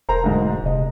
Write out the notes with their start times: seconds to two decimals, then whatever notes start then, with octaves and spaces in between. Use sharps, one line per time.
0.09 E1 A#4 C5 A#5
0.23 D2 G#2
0.66 C3 D#5